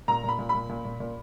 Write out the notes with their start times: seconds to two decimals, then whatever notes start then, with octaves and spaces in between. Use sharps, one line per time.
0.08 A#2 A#5
0.24 A#2 B5
0.39 A#2
0.49 B5
0.54 A#2
0.69 A#2
0.85 A#2
1.00 A#2